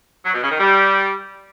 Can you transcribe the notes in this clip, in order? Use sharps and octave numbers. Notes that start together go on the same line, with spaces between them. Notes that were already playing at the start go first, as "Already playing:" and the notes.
F#3
B2
C#3
D#3
G3